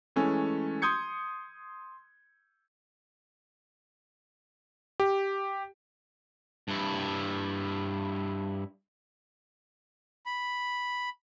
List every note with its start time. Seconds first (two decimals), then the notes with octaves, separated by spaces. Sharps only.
0.16 E3 G#3 A3 C#4
0.82 C6 D#6 G6 G#6 C#7
5.00 G4
6.68 G2 E4
10.26 B5